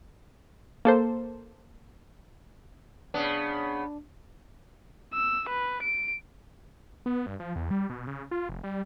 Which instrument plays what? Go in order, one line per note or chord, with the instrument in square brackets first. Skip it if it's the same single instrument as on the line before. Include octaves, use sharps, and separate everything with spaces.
[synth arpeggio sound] A#3 A4 C5
[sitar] C#3 B3 [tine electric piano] D4
[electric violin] E6
B4
D7
[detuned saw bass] B3
G2
F3
E2
G3
B2
C#3
F4
F1
G3